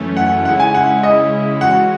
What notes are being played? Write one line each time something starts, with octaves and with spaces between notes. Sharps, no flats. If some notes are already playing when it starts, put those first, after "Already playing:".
Already playing: F#2 E3 A3 C#4
F#5
C#3 G#3 C#4 E4 F#5
G#5
F#5
D#5
C#3 E3 G#3 C#4 F#4 F#5